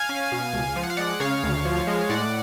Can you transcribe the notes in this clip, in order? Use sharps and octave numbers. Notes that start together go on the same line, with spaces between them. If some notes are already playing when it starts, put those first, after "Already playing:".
Already playing: F5 G#5
C#4
B2
C#2
F3 G#5
F#5
F5
G#3 D5 F#5
C#3 C#5 F5
D2
F3
G#3
A2 D5 F#5